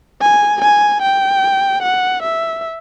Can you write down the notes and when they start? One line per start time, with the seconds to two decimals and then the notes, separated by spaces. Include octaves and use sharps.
0.22 G#5
0.62 G#5
1.02 G5
1.83 F#5
2.23 E5